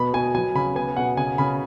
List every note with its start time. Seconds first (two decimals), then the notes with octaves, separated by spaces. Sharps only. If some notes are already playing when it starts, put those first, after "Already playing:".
Already playing: B2 B3 B5
0.13 B2 G#5
0.35 F#3 G#5
0.55 C#3 B5
0.75 B3 G#5
0.97 B2 F#5
1.17 C#3 G#5
1.38 C#3 B5